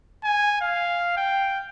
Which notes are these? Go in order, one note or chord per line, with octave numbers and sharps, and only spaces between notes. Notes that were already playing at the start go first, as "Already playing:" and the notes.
G#5
F5
G5